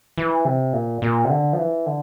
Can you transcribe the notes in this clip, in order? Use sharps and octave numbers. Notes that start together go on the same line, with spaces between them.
E3
C3
A#2
A#2
C3
D3
F3
E3
D3